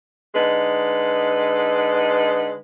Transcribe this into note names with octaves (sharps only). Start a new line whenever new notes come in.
D3 G#3 D#4 B4